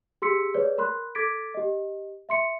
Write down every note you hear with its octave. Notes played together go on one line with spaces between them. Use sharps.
G4 G#4 C6 E6 B6 C#7
G#4 B4 C#5 D5
A#4 B5 C6 F#6
A4 D6 G#6 A6 B6 D7
G4 D#5
E5 C6 C#7